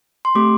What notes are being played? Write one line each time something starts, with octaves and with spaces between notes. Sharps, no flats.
C6
A3 C4 G4 D6